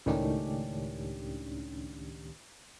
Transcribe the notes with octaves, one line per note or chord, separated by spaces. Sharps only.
C#2 A2 D#3 C#4 D4 G4